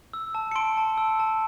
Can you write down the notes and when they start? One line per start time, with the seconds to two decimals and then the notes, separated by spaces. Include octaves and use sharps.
0.13 E6
0.35 A5
0.51 C#7
0.55 C6 D7
0.77 A5
0.98 E6
1.20 A5